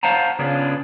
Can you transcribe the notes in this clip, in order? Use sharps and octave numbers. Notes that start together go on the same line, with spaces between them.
C5 F5 F#5 A5 A#5
C#3 B3 D4 F4 G#4